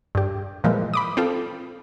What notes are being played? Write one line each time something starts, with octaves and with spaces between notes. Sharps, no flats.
G2 G4
A#2 E3 F3 G3 G#3 A#3
B5 D6 D#6
C4 F4 A4